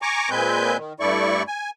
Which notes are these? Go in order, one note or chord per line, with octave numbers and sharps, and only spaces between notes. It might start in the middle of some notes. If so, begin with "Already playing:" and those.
G#5 A#5 C#6 D6
A#2 G#3 C4 B4 G#5 G6
D#3
G2 A3 E4 D5 C#6
G#5